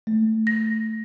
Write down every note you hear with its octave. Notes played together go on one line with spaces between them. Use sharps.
A3
A#6